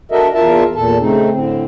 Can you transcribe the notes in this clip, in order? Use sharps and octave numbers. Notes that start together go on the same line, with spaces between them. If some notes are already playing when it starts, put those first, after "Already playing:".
D4 F#4 A4 A#4 D#5 E5
E2 F4 A#4 E5 A5
E2 A#2 A4 A5
C#3 A3 C4 D#4
A2 D3 C4